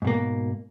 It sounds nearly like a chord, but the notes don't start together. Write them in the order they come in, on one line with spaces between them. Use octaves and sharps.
G#2 B2 A#3